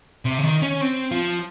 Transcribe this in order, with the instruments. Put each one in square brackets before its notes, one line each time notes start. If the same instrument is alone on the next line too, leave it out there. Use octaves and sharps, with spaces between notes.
[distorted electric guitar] C3
C#3
D#3
C#4
C4
F3